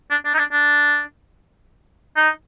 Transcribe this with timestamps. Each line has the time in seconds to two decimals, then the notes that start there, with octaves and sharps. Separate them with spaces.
0.11 D4
0.25 D4
0.34 D#4
0.38 D4
0.52 D4
2.17 D#4